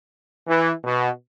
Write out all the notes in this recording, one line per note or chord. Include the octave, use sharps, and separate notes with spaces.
E3
B2